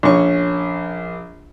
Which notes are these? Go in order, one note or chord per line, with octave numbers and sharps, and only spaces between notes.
A#1 C#4 C#6